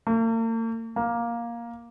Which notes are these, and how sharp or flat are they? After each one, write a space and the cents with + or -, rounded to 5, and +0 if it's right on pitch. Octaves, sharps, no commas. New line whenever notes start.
A#3 -45
A#3 +10